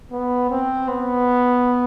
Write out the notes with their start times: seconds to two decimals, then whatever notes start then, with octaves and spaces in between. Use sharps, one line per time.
0.11 B3
0.50 C4
0.88 B3